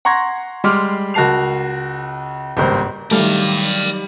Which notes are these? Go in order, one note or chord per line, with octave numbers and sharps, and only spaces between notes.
F#5 A#5 C6 C#6 G#6 A#6
G3 G#3 C6 D6 F6
C#2 F#4 A#4 A5 C7 F7
G#1 C#2 G2 A#3 C5
D#3 F#3 G3 A3 D5 F5